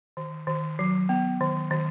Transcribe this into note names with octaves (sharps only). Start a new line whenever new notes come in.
D#3
D#3
F#3
B3
D#3
D#3